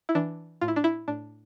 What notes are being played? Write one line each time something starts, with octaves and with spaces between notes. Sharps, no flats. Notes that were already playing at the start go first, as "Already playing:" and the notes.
E4
E3 D4
A2 F4
E4
D4
E4
A2 D4